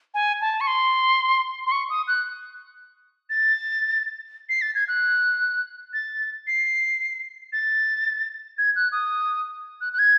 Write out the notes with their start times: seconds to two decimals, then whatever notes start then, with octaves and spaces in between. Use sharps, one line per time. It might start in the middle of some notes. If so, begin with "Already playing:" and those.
0.14 G#5
0.41 A5
0.61 C#6
0.67 C6
1.67 C6
1.72 C#6
1.90 D#6
2.08 F#6
3.30 A6
4.49 C7
4.62 A6
4.75 G#6
4.88 F#6
5.93 A6
6.47 C7
7.53 A6
8.58 G#6
8.76 F#6
8.92 D#6
9.81 F#6
9.93 F#6
9.99 G#6